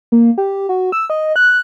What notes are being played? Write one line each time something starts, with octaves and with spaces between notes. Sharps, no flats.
A#3
G4
F#4
E6
D#5
F#6